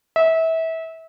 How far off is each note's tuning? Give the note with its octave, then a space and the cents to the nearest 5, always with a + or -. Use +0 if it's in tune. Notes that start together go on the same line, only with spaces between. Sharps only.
E5 -25